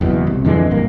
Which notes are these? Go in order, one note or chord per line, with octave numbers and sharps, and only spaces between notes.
F#1 E2 B2
C2
F2 D3 E3 G#3
A#1 G2 A#3